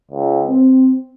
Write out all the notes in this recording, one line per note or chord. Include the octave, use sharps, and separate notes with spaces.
C#2
C4